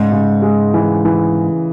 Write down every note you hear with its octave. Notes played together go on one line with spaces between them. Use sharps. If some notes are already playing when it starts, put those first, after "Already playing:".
Already playing: G#2 C#3
C#3
G#3
E3
E3